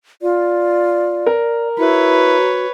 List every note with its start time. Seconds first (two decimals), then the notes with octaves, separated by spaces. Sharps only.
0.22 F4 D5
1.26 A#4
1.78 E4 F#4 B4 C#5